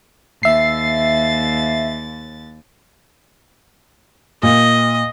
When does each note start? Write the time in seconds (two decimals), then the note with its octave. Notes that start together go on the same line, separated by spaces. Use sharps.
0.43 D#2 E5 A6 C7
4.43 A#2 D#5